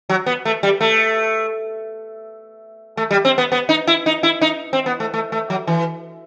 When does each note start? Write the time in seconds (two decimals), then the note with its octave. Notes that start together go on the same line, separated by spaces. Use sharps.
0.10 F#3
0.26 B3
0.45 A3
0.63 G3
0.81 A3
2.97 A3
3.11 G3
3.25 C4
3.38 B3
3.52 B3
3.69 D#4
3.87 E4
4.06 D#4
4.23 E4
4.41 D#4
4.73 C4
4.86 B3
5.00 A3
5.14 A3
5.32 A3
5.50 F#3
5.67 E3